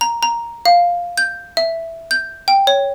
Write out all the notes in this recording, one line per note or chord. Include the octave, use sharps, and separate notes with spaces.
A#5
A#5
F5
G6
E5
G6
G5
C#5